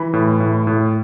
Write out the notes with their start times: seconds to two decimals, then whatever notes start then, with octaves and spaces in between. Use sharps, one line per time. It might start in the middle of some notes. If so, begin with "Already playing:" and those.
Already playing: E3 B5
0.13 A2
0.40 A2
0.67 A2